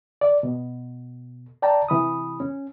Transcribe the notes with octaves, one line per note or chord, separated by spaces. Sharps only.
D5
B2
D5 G5 A5 A#5
C3 E3 B5 D#6
C#4